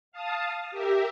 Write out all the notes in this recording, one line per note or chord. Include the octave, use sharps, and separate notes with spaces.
F5 A5 D#6
G4 A#4 E5